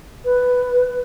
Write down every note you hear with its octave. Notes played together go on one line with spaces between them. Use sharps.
B4